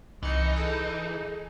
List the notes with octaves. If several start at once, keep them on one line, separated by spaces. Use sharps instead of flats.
C2 E3 D#4 D#5 C#7
G#4 A4 G6
G#4